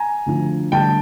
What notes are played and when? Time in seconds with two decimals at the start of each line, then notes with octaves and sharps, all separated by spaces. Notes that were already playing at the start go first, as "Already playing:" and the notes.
Already playing: G#5 A#5
0.26 D2 D3 F3
0.72 D2 D3 G3 G5 A5